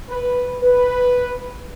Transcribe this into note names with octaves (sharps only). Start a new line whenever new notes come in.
B4
B4